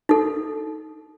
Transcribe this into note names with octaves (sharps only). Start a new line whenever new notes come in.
D#4 A4